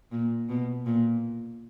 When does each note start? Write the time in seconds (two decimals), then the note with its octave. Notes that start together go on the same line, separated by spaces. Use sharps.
0.11 A#2
0.49 B2
0.86 A#2